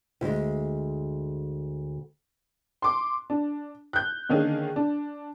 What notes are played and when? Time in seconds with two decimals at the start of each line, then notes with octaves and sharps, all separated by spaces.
0.21 D2 G#3
2.82 C6 D6
3.30 D4
3.93 F#6 G6
4.29 D3 D#3 A#3 C#4 G#4
4.76 D4